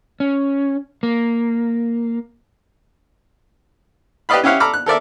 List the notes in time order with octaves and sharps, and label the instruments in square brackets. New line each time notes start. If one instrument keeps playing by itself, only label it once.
[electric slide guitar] C#4
A#3
[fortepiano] G4 B4 D5 D#5 F5 B5
C#4 E4 G4 C#5 F5 F#5
A4 A#5 B5 D6 E6 F6
F#6
A4 A#4 D5 E5